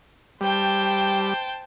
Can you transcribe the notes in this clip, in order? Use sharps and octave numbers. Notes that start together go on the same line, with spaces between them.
G3 C5 G5 A5